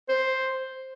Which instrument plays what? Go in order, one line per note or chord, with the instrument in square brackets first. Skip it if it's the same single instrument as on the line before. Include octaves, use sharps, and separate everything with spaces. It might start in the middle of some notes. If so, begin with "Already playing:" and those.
[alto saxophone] C5